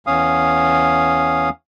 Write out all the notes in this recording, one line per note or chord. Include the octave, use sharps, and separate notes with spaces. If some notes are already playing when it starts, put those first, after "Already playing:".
E2 C#4 F5 D#6